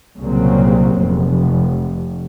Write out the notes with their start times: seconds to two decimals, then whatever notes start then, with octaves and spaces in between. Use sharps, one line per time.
0.20 C2 A#2 C#3 F#3 A#3 C4
1.01 F1